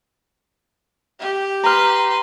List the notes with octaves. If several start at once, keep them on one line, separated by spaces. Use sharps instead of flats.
G4
B4 A#5 C6 F6